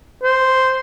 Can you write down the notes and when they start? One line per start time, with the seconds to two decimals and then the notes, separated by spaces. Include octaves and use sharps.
0.23 C5